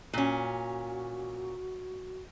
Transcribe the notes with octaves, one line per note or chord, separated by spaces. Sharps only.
A#2 C#4 F#4